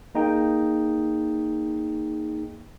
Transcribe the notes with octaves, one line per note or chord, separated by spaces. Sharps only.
A#3 D#4 G#4 G5